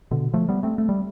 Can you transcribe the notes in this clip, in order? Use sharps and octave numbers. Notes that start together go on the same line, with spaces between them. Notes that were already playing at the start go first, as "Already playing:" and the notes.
B2 D3
F3 A3
G3 B3
A3 C4
A3
G3